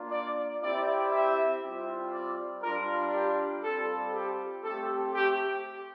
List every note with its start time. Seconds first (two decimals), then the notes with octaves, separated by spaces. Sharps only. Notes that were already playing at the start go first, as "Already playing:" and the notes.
Already playing: A#3 D4 F4
0.11 D5
0.61 C4 E4 G4 D5
1.12 E5
1.62 G3 C4 F4
2.13 D5
2.62 G3 D4 F4 A#4
3.13 G4
3.63 G3 C4 F4 A4
4.14 G4
4.63 A3 C4 G4 A4
5.13 G4